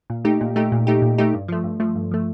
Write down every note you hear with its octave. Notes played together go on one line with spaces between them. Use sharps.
A#2
A3 D#4 G4
A#2
A3 D#4 G4
A#2
A3 D#4 G4
A#2
A3 D#4 G4
G2
F3 A3
G2
F3 A3
G2
F3 A3